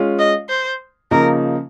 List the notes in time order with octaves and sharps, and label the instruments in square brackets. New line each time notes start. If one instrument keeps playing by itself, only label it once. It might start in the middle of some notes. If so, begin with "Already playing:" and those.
Already playing: [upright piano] G#3 C#4 F4
[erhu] D#5
C5
[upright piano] C#3 F3 A#3 D#4 [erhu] A#4